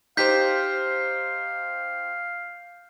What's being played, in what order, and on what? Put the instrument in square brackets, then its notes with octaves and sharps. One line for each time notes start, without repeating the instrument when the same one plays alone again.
[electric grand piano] D#4 G4 C5 [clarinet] F5 [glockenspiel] G6 B6